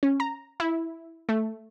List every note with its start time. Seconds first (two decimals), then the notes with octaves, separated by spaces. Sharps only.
0.03 C#4
0.20 A#5
0.60 E4
1.29 A3